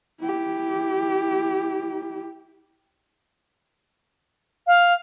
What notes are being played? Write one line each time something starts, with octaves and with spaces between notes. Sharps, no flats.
E4 G4
F5